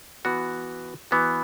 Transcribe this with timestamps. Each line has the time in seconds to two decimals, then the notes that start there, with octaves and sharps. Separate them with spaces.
0.25 E3 B3 F#4
1.11 E3 B3 F#4